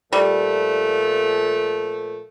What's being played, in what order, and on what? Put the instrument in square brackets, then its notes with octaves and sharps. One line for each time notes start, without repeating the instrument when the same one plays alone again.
[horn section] A#2 F3 A3 [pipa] G3